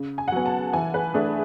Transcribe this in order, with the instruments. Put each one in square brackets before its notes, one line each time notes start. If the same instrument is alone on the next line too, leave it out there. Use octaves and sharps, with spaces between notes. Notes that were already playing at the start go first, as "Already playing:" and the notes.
Already playing: [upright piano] C#3
[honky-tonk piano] G#5
F#5
[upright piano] F#3 B3 [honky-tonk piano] G#5
[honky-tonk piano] A5
[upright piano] E3 [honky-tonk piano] G#5
[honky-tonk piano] B4
[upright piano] A3 D4 [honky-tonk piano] G#4